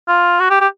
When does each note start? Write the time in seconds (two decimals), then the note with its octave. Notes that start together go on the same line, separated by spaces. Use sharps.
0.08 F4
0.40 F#4
0.50 G4
0.61 G4